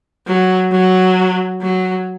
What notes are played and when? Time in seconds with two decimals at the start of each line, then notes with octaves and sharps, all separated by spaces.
0.27 F#3
0.71 F#3
1.61 F#3